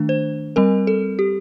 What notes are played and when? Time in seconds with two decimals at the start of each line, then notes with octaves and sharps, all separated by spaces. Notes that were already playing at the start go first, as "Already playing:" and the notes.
Already playing: D#3 A3 D4
0.09 C5
0.56 G3 C4 A#4
0.87 A4
1.19 G4